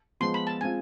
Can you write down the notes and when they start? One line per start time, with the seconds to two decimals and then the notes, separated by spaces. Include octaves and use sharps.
0.20 F3 G#3 B3 C6
0.34 B5
0.47 A5
0.61 G#3 C4 F4 G#5